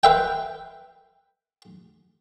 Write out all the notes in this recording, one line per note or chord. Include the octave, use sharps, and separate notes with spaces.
B4 E5 G5